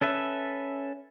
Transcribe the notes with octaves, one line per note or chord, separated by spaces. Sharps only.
C#4 A4 B4 E5